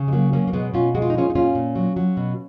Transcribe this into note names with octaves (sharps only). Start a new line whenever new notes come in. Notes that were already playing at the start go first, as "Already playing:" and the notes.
Already playing: C#3
G#3
F#3 A#3
F#3 A#3 C#4
A#3
B2 G#3 B3
B2 C#4 F4
G#3 F#4
F4
D#4
G#3 C#4 F4
D#4
A#2 C#4 F4
A#2
F#3
F#3
B2